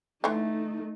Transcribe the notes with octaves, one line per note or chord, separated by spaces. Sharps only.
D3 E3 A3 D#4